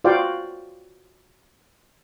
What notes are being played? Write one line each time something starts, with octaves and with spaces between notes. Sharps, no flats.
F4 F#4 C5 D5 F5 G5